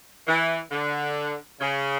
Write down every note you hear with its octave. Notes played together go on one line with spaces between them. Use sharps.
E3
D3
C#3